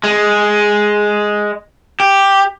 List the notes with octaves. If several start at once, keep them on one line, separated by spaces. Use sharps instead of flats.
G#3
G4